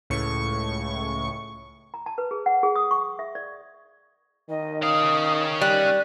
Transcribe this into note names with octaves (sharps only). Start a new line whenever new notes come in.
C#2 A2 C#6
A#5
A5
B4
G#4
F#5
G#4
D#6
C#6
E5
D5
D#3 D#5
C#4 F5 D#6
G3 F#6